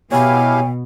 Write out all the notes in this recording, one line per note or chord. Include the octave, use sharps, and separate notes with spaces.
B2 E4 G4 C#5 F5 G5 G#5 B5